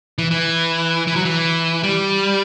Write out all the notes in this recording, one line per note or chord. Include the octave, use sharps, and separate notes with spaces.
E3
E3
E3
F#3
E3
G3